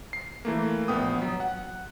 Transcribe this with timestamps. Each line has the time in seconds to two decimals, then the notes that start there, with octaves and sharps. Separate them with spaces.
0.13 C7
0.45 E3 A3 A#3
0.88 A#1 B3 G5 D#6
1.22 F#3
1.40 F#5